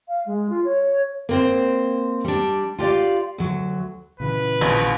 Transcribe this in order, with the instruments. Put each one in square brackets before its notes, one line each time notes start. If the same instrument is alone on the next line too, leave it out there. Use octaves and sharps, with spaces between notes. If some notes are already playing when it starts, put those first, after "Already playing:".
[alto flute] F5
G#3
F4
C#5
[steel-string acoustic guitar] A#3 C4 C5
G3 D4
F4 G4 D5 F5
D2 F#3
[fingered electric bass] A#2 C#3 E3 [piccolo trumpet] B4
[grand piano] A#1 [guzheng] B2